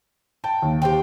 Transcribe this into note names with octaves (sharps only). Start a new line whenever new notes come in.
G5 A5
D#2
G4 C5 G5